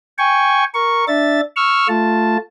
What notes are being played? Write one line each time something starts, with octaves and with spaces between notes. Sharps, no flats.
G5 G#5 C#6
A#4 C#6
D4 E5 A6
C#6 E6 F6
A3 F4 A5